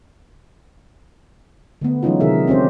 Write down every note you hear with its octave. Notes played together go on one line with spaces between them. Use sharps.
D3 A3 B3
E3 F#3 G#3 C#4 D#4 F4
C3 D#3 G#4 A#4 E5
C4 C#4 G4 C5